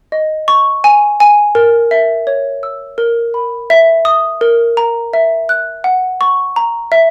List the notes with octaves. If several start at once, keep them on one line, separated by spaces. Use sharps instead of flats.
D#5
C#6
G#5
G#5
A#4
E5
C#5
E6
A#4
B5
E5
D#6
A#4
A#5
E5
F#6
F#5
C#6
A#5
E5